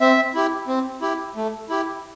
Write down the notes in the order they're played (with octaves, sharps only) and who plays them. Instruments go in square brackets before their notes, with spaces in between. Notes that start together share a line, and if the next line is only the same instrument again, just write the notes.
[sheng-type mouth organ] C4 E5
E4 G4
C4
E4 G4
A3
E4 G4